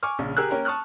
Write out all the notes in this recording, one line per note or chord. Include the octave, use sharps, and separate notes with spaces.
G#5 C#6 D6 F6
A#1 C#3
G4 G#4 A#4 G#5 E6 F#6
A#3 C#4 A#4 G5
A5 C#6 D#6 F6 F#6